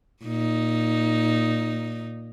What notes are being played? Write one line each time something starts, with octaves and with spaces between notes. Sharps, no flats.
A#2 D#4